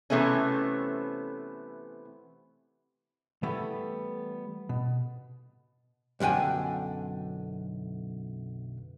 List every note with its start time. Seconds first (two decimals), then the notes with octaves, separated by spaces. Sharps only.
0.10 C3 E3 A3 B3 C#4
3.43 E3 G3 A3 B3
4.69 B2
6.20 B1 F#2 D3 G5 G#5